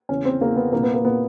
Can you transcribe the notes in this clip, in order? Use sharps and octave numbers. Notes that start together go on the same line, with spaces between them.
E2 C#3 E3 C#4
C4
E2 C#3 E3 A#3
B3
C2 A#2 A#3
B3
A#3
A#2 B3